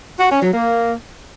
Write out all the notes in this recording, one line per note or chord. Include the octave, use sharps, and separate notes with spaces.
F#4
C#4
F#3
A#3